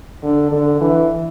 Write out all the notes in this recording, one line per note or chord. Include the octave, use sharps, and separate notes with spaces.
D3
D3
E3